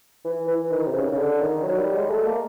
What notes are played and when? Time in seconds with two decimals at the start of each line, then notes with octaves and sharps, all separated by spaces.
0.25 E3
0.48 E3
0.71 D#3
0.87 C3
0.94 C#3
1.08 C#3
1.18 D3
1.41 D#3
1.63 F#3
1.79 G3
1.95 G#3
2.11 A3
2.26 A#3